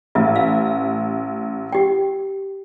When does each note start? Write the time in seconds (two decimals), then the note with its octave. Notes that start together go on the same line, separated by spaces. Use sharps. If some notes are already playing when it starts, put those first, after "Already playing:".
0.15 A1 E5
0.36 F5
1.72 G4 G5